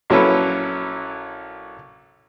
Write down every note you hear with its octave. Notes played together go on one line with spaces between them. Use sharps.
A#1 F#3 C#4 E4 A4 B4